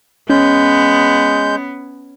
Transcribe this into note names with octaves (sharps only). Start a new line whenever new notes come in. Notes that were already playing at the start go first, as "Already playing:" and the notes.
G#3 B3 C#4 G6